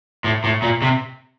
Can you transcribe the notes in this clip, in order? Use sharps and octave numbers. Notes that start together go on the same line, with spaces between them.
A2
A2
A#2
C3